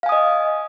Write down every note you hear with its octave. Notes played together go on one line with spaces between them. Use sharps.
D#5 F5 G#5 D#6